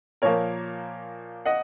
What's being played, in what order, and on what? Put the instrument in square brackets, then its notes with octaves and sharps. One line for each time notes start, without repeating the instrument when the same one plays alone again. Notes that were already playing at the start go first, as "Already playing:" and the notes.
[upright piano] A#2 F3 A#3 A#4 C#5
D#5 F#5